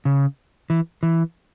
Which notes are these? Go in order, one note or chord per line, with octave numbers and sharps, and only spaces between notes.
C#3
E3
E3